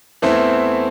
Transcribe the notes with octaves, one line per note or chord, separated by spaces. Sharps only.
E2 E3 A3 C4 E4